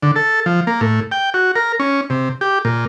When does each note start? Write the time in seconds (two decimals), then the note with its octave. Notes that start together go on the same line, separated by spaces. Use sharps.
0.03 D3
0.16 A4
0.46 F3
0.67 A#3
0.81 A2
1.12 G5
1.34 F#4
1.56 A#4
1.80 C#4
2.10 C3
2.41 G4
2.65 A#2